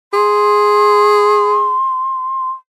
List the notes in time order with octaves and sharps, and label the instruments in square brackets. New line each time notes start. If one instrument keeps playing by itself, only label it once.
[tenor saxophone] G#4 [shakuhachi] C6